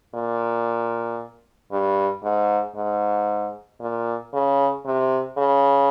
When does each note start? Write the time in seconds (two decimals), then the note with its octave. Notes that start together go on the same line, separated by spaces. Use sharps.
0.14 A#2
1.72 G2
2.23 G#2
2.76 G#2
3.81 A#2
4.33 C#3
4.86 C3
5.37 C#3